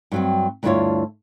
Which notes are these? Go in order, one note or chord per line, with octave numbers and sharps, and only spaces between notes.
G2 F#3 C4
D2 G2 D4 E4 F4 C#5